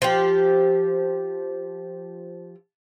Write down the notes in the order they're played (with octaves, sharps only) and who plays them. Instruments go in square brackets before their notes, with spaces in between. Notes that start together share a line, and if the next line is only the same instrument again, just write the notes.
[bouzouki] F3 G4